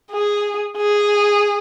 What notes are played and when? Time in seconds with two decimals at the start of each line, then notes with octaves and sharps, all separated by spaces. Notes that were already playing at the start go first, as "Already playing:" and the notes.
0.12 G#4
0.78 G#4